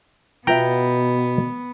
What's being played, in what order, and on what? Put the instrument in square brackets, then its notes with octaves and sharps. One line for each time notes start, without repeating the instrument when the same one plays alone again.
[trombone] B2 [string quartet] B3 [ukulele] F4 B4 E5 [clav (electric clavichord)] G5 A#5